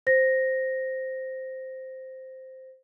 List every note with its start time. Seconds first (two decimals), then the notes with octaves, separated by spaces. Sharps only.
0.07 C5 A#6